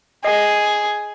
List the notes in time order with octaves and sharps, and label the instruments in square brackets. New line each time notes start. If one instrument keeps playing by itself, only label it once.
[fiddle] G#4 [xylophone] D#5 C7